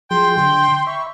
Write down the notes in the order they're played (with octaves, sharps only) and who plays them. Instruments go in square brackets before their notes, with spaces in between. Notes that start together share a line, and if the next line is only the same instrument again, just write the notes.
[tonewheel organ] F3 F#3 G#4 [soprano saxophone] G5 [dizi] C6
[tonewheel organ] D3 [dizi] C6
[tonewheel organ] E5 B5 [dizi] C#6